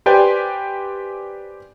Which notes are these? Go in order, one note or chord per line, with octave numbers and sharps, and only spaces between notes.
G4 B4 C5 D5 G5 G#5